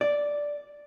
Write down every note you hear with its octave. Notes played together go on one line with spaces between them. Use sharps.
D5